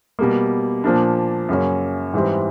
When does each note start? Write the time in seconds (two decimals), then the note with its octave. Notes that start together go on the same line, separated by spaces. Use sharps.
0.19 B2 G3 A#3
0.84 A#2 F3 A#3 D4
1.49 F#2 C#3 F#3 A#3 C#4
2.14 G#2 E3 G3 C4